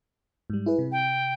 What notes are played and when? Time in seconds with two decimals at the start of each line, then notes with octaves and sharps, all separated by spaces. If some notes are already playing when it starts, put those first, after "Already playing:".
0.50 G#2 G3
0.66 E4 G#4 B4
0.79 C3
0.92 G5